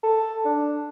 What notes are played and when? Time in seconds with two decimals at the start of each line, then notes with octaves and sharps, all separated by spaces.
0.03 A4
0.45 D4